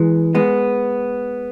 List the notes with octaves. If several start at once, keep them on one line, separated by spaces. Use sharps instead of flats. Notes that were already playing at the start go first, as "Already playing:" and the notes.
Already playing: E3 G#3
G#3 B3